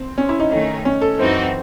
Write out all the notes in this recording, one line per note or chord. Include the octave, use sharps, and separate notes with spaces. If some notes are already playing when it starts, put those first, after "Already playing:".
Already playing: C4
C#4
E4
D#4
D#3 A3 C#4 D#4
C#4
A4
F#2 E3 C4 D#4 F#4 C5